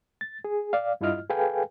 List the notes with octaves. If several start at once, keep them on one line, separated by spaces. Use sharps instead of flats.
A6
G#4
D5 F5
G2 E4 F4 D#5 F6
G#4 A4 B4 F5 G5 G#5